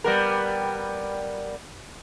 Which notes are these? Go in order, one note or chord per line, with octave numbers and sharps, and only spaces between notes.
G3 B3 A#4